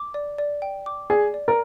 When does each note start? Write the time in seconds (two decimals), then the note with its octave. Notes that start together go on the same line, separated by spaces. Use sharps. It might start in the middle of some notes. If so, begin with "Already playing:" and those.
Already playing: D6
0.14 D5
0.38 D5
0.62 G5
0.86 D6
1.10 G#4 D5
1.34 D5
1.48 A#4